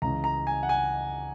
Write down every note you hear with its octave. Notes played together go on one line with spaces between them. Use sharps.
C#2 C#3 E3 A#5
A#5
G#5
F#5
G#5